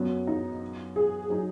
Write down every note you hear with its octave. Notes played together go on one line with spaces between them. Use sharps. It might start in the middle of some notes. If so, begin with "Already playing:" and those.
Already playing: F#2 F#3 B3
D#4
G#4
F#3 D#4 G#4